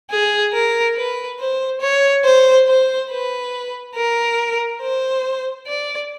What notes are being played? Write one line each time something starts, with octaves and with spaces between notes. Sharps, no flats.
G#4
A#4
B4
C5
C#5
C5
C5
B4
A#4
C5
D5